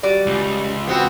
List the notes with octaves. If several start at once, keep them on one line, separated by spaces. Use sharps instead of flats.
G3 F#4 D5
C#2
B3 C4 F#4